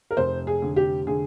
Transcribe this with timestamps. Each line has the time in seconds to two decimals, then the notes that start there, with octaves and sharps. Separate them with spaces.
0.11 A#4
0.17 F1 C5
0.47 G#4
0.62 D3
0.76 G4
1.07 D3 G#4